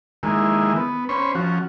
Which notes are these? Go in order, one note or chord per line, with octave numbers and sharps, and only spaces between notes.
D#3 G#3 A#3 E4
B3
C#4 C5 C#5 B5
F3 C#4 F#4